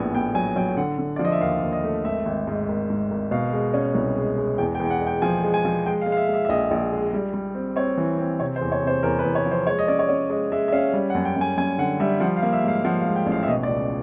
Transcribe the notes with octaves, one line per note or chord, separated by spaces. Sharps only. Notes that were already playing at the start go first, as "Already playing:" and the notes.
Already playing: A#1 A2 B3 G#5
B3 G5
F#3 G#5
F#3 G5
G5
D3 F#5
D3
F3 D5
D#5
E5
D#2 F5
D#2
D#5
A3
G#1 E5
G#1
G#2
G#1
G#2
G#1
B2 F5
G#3
C#4
C2
G#3
G#3
E2 G5
G5
E2
G5
F#5
G#3
G5
F3 G#5
G#3
G#5
F3
G#3 G5
F5
G#3
F5
E5
G#3 E5
E5
A#1 D#5
A#1
G#3
G3
G3
C4
C4 C#5
E3
C4
C3 C#5
C5
E2
C#5
C3 C5
E2 A#4
B4
E2
C#5
F3
C5
G#3 C#5
D#5
C#4 D5
C#5
C#4
G#3 D#5
G#3 E5
E5
C#4 F5
G3
F#5
F#2
G5
F#2
G#5
F#2 G#5
D3 F#5
G3 E5
F3 F#5
F5
A#3
E5
G#2 F5
F3 F#5
F5
G#2
G5
A1
F5
E5
B2 D#5
D5
C#2